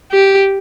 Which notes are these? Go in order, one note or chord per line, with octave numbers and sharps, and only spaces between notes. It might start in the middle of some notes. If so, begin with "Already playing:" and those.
G4